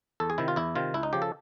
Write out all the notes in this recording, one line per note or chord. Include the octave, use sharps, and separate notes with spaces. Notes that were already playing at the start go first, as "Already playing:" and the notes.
E2 A4
G#4
C3 D#3 E4
F4
E2 E4
C3 D#3 F4
C#2 E4
D#4
C#3 F3 G4
A4